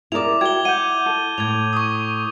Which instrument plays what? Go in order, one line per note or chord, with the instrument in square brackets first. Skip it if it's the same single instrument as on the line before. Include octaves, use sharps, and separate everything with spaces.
[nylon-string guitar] E4 D5 [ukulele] G#4 A#4 [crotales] D6 F7
[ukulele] F#4 G5 [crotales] G#6 G7
[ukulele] F#5 [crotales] G6 D#7
[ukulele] A4
[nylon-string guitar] A2 [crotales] G#6 F7
[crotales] C#6 D#6